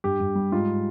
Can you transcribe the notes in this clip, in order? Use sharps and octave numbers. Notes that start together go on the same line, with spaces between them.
G2 G4
G2
G3
G#2 F4